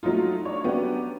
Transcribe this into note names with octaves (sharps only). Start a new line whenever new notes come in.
F#3 A3 D#4 F4
D4 C#5
F#3 B3 C#4 D4 G4